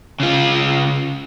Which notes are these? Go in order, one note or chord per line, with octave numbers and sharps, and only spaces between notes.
C#3 F4